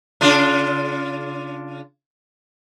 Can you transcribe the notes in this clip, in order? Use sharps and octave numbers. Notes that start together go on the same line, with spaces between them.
C#3 D4 F4